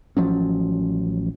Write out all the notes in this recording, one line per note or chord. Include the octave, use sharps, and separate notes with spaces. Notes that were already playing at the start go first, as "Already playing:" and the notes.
A1 F3 F#3 C#4